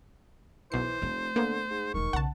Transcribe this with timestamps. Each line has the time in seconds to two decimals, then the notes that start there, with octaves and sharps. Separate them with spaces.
0.72 B1 E3 C5 C7
1.02 F1 A3
1.36 D3 A#3 B3
1.70 G#2
1.94 E1 D#3 G#3 C#6
2.13 B1 C#3 F#5 A5